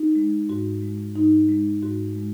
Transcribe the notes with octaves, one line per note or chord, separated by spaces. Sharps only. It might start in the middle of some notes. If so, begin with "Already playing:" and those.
Already playing: D#4
G#3
G#2 F#4
G#3
G#2 D#4
G#3
G#2 F#4
G#3